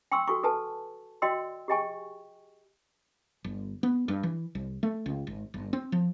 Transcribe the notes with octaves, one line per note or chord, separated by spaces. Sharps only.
G5 G#5 C6 C#6 E6
F#4 A4 G#5 C#6
A4 B4 G#5 A5
F#4 D5 D#5 G5 C6 E6
G4 G#4 D#5 G5 G#5 C#6
G1
B3
G2
E3
C2
A3
C#2
G#1
G1
C4
F3